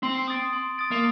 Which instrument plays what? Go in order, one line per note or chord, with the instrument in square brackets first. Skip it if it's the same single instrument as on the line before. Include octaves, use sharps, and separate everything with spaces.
[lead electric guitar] C4 [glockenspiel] C6
[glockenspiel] D#6 A6 D7
C6
D#6 A6 D7
[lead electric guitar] A#3